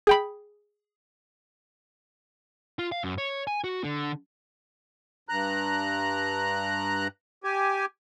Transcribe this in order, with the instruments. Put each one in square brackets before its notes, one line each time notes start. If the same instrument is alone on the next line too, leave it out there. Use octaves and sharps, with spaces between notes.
[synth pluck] G#4 G5 B5
[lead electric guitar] F4
F5
F#2
C#5
G#5
F#4
D3
[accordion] G2 A#5 F#6
G4 G#5